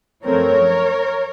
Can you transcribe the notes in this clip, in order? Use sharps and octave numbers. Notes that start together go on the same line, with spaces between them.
F#2 F3 A3 C4 A#4 C#5